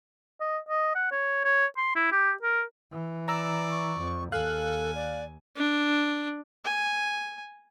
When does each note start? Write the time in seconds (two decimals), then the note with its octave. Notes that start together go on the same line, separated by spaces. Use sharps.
0.41 D#5
0.69 D#5
0.95 F#5
1.12 C#5
1.45 C#5
1.77 C6
1.96 E4
2.12 G4
2.42 A#4
2.92 E3
3.28 D5 A#5 E6
3.70 C#6
4.00 F2
4.32 D#2 A4 F5 G#5 F#6
4.95 D5
5.57 D4
6.65 G#5